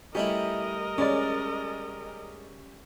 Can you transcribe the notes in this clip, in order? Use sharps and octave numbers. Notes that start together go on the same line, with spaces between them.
G3 A3 C#4 D#4 E4 G4 A#4 D#5
G#3 C#4 D5